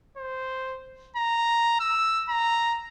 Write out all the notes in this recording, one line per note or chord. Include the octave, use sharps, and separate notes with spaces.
C5
A#5
E6
A#5